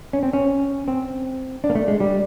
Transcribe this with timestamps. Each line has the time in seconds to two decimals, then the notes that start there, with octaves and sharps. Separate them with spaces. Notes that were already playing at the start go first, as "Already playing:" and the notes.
0.13 C#4
0.23 C4
0.33 C#4
0.88 C4
1.64 D4
1.70 A#3
1.75 A3
1.88 G#3
2.00 G3